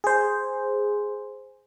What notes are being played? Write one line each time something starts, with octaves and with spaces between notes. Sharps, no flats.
G#4 C5